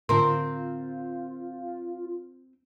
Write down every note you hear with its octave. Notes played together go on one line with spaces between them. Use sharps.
A2 D3 C4 F4 A#4 C6